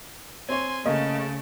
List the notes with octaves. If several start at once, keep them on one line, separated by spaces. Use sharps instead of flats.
C4 C#5 G#5 C6
C#3 A3 A#3 D#5 A5